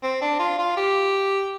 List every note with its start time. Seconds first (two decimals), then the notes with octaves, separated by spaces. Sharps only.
0.03 C4
0.22 D4
0.39 F4
0.58 F4
0.77 G4